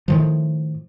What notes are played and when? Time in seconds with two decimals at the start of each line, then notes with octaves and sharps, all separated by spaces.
0.08 A2 D#3 F3